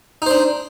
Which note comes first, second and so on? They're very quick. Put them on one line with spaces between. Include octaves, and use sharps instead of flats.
D#4 C5 D4